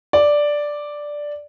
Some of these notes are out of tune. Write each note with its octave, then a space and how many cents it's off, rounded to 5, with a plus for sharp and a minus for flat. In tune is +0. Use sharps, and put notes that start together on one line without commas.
D5 +0